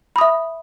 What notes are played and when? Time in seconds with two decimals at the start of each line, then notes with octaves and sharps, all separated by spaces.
0.16 B5
0.18 D#6
0.21 E5